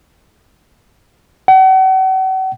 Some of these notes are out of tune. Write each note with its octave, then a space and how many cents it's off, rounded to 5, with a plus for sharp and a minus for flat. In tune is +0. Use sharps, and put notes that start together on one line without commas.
F#5 +40